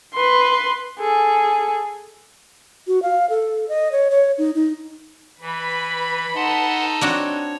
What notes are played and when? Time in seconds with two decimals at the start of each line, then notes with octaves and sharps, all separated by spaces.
0.14 B4 C6
0.99 G#4 A4
2.87 F#4
3.03 F5
3.30 A4
3.69 D#5
3.92 C#5
4.11 C#5
4.38 D#4
4.55 D#4
5.41 E3 B4 B5
6.35 D#4 A4 F#5 A5 C6
7.01 C4 D4 F#4 C#5